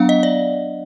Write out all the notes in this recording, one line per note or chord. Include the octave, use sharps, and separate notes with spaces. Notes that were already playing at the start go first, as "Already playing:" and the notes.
Already playing: F#3 B3 D4 F5 F#5
D#5
D5